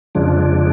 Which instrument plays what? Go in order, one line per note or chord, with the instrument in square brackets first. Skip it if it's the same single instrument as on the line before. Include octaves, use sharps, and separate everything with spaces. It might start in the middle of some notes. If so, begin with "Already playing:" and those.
[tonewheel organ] F2 C#3 F3 G#3 D4